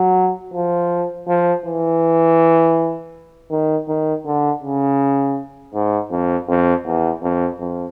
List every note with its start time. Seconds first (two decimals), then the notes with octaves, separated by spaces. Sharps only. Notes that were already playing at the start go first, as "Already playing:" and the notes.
Already playing: F#3
0.54 F3
1.27 F3
1.66 E3
3.51 D#3
3.88 D#3
4.25 D3
4.63 C#3
5.74 G#2
6.11 F2
6.48 F2
6.85 E2
7.23 F2
7.60 F2